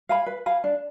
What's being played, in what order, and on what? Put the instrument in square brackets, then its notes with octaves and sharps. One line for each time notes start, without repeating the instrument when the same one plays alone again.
[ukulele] F5 G#5 B5
B4
F5 G#5 B5
D4